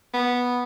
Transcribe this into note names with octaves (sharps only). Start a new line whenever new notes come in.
B3